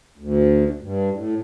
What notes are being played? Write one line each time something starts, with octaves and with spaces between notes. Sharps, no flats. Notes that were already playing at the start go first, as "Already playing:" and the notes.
D2
G2
A2